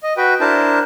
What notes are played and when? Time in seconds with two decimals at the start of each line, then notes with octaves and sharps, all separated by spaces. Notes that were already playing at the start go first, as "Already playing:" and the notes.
0.03 D#5
0.17 F#4 B4 G5
0.40 D4 E4 A#4 C5 A5